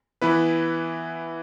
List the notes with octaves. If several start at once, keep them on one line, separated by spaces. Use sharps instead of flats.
E3 B3 E4 B4